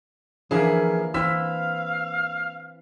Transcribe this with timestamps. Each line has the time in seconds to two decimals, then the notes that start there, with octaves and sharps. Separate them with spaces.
0.51 D3 E3 F3 A#3 G#4 A#4 E5
1.14 E3 C4 E4 F5 E6 B6